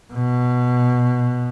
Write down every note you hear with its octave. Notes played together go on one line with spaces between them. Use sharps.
B2